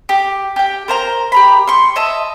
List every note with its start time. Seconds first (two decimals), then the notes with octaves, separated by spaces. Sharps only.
0.09 G4
0.56 G4 G5
0.88 A#4 C5 A#5
1.32 G4 A#5 B5
1.68 C6 C#6
1.96 D#5 E5 A5